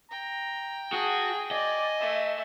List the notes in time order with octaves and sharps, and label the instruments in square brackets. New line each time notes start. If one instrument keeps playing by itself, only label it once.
[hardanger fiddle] G5 [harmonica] A#5
[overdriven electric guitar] F#4 [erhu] G#4 [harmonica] A5 D#6
[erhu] D5 [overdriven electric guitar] D#5 [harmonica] G#5
[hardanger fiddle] A3 [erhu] E5